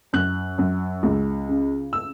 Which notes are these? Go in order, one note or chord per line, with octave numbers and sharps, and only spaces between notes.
F#2 F#6
F#2
C#2
C#3
E6